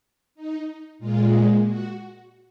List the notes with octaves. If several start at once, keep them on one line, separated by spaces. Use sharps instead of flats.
D#4
A#2 G#3 F4
F#4